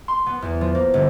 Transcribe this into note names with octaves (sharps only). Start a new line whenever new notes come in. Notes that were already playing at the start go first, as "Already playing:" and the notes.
C6
B3
E2
F3
A#3
G1